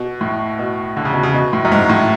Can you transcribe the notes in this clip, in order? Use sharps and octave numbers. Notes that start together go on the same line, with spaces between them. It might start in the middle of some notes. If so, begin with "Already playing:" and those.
Already playing: B2
A2
B2
D3
C#3
B2
C#3
B2
A2
F#2
G#2
A2